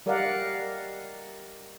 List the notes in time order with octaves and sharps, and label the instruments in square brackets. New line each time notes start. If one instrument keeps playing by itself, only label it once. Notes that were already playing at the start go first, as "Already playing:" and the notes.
[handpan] G3 A#4 D5 D#5 F5 F#5